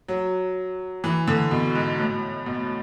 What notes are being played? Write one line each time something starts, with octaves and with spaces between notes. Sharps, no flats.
F#3
E3
D3
B2
G#2
A2
B2